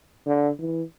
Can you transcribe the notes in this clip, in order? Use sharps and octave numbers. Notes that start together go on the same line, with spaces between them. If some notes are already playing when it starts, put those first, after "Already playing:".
D3
E3